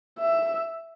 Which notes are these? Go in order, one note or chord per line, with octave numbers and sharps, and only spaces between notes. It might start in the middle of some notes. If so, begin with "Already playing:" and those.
E5